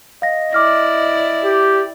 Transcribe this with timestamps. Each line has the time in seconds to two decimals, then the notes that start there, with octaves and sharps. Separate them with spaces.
0.22 D#5 F5 A#6
0.53 E4 D5 D6 F6 A#6
1.44 G4